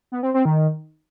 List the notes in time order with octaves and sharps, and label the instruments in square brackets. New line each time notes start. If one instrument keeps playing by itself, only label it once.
[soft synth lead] B3
C4
C4
D#3